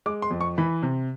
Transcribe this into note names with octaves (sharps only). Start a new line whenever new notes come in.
G#3 D6
C6
F2
C#6
E3 B5
C3